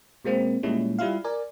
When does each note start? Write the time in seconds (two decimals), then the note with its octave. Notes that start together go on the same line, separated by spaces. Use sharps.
0.25 B2 G#3 A#3 C4
0.63 A#2 G3 G#3 C#4 E4
0.99 G3 E4 F4 F5
1.24 A#4 D5 G#5